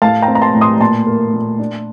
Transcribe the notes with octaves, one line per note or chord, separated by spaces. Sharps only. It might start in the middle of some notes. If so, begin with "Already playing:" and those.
A2 F5 A5
G5 A#5
C4
A#5
A5 C6
A2
C6 D#6
A#2 A5 C6
A#3
A#2
D4